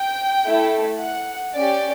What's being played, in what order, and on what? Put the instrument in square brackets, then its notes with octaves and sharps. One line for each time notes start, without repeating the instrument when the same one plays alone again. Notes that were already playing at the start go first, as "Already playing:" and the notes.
Already playing: [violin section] G5
A3 E4 A4
F#5
C#4 G4 D5